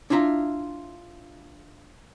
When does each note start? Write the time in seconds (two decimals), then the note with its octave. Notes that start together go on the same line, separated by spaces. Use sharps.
0.10 D4 E4 F4 E5 A#5